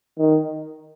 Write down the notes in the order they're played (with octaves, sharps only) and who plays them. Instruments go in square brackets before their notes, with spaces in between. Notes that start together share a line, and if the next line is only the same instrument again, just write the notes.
[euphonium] D#3